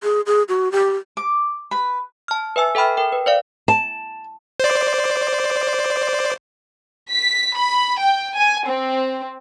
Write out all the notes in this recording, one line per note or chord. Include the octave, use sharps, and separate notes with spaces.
G#4
G#4
F#4
G4
D6
B4 B5
A5 F6
B4 E5 G#5 E6
A4 E5 G5 B5 F6
A#4 G5
B4
C5 D5 F5
A5
C5 D5
B6
B5
G5
G#5
C4